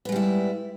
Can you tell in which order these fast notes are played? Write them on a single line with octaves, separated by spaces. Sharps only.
B3 G#3 G3 E4